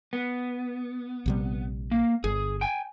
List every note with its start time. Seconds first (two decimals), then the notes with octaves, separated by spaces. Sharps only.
0.13 B3
1.26 A#1 C3 G3
1.91 A#3
2.24 G1 G#4
2.61 G5 G#5